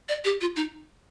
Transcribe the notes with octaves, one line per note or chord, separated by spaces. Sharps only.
D5
G4
F4
D#4